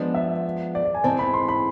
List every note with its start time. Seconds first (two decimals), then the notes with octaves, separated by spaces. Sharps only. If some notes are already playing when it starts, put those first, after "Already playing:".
Already playing: F3 G#3 B3 D4
0.15 E5
0.75 D5
0.85 D5
0.94 G#5
1.04 G#2 E3 G#3 C4 A5
1.19 B5
1.34 C6
1.49 B5